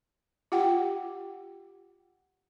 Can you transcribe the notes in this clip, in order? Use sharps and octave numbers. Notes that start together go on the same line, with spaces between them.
F4 G4 F#5 G5